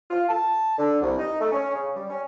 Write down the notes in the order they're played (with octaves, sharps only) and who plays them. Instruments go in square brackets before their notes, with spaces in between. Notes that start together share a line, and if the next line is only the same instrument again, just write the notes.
[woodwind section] F4
A5
D3
C2
D#4
A3
C#4
C#3
G3
C#4